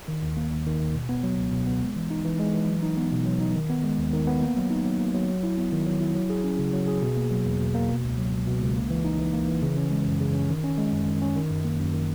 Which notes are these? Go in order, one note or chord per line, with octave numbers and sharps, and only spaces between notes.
D#3
D#2
A#3
D#2
D#3
D#2
B2
B3
F#3
C#2
B2
B3
G#3
E3
D#4
E3
G#3
E3
F#3
D#4
B3
B2
F#3
D#4
D#3
B3
G#3
D#2
D#3
B3
A#3
F#3
D#4
F#3
A#3
F#3
F#3
E4
B3
D#3
F#3
E4
F#3
G#4
C#4
C#3
F#3
G#4
B2
A#3
F#3
E2
B2
A#3
B2
C#2
F#3
C#2
B2
C#2
A#3
E3
D#4
E3
A#3
E3
C#3
C#4
G#3
F#2
C#3
C#4
D#3
C#4
G#3
F#2
D#3
C#4
D#3
F#2
A#3
F#2
D#3